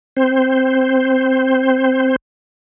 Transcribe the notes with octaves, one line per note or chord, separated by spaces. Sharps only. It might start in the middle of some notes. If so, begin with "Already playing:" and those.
C4 C5